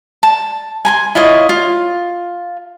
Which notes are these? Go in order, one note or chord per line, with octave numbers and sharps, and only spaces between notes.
A5
G#5 A#5 C6
E4 F4 C#5 D#5
F4